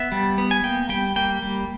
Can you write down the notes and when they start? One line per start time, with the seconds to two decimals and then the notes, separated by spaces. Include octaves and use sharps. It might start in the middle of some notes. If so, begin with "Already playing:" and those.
Already playing: B3 E5
0.12 G3
0.38 B3
0.51 G#5
0.63 A#3 G5
0.89 G3 G5
1.16 A#3 G5
1.42 G3